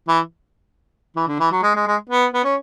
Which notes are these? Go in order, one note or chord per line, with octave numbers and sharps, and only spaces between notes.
E3
E3
D3
E3
F#3
G#3
G#3
G#3
B3
B3
C#4